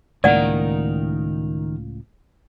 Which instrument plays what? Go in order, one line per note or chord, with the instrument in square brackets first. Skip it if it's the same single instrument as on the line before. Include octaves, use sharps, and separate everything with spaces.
[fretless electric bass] C#2 A2 A#3 [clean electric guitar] D#3 A#4 [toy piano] D5 F#5